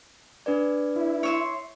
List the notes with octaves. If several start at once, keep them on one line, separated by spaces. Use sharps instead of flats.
D4 B4 D5
E4
C#5 E5 C6